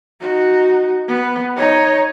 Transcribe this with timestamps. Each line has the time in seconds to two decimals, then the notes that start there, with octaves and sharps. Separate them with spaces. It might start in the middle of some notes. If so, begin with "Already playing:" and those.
0.21 D#4 F#4
1.08 B3
1.56 D#4 C#5